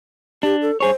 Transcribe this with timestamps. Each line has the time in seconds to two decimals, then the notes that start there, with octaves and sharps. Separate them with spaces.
0.43 D4 G4
0.62 A4
0.80 G2 G#4 C5 C#5